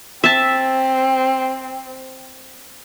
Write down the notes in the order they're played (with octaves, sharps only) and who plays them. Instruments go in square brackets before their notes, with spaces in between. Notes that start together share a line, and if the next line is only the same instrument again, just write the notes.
[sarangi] C4 [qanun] E5 A5